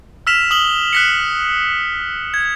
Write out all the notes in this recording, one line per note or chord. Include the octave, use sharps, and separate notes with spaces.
E6 F6 B6 E7 F7
D#6 F#7 G7
F#6 B6 C#7
G#6